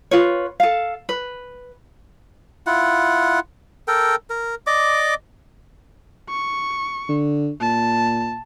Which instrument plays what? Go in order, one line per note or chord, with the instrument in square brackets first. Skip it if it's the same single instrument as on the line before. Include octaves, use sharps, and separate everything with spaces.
[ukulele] F4 B4 C#5
A4 F5
B4
[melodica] E4 F4 F#5
A4 A#4 G5
A#4
D5 D#5 D6
[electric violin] C#6
[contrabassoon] D3
[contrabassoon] A#2 [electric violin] A5